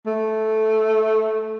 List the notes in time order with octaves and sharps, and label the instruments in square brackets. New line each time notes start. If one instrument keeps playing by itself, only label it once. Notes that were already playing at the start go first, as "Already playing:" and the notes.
[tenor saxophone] A3